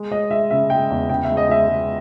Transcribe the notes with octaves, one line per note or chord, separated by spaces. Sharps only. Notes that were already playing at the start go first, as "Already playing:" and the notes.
Already playing: G#3
G#3 D#5
G#3 E5
C#3 E5
G#3 G5
E2
C#3 G5
E5
G#3
D#5
G#3 E5
G#3